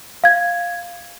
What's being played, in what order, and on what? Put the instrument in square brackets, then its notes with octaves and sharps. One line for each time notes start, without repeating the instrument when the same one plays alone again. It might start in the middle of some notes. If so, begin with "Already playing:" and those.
[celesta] F5 G#6